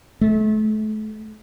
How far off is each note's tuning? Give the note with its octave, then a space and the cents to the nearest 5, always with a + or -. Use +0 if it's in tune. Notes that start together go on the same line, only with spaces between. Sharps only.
A3 -35